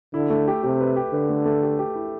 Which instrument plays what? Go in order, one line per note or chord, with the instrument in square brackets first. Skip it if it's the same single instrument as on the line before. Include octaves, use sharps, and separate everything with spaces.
[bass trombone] D3 [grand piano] E4
[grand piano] A3
G4
[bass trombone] C3 [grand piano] G4
[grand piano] B4
G4
[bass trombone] D3 [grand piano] B4
[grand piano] A3
A3
G4
G4
E4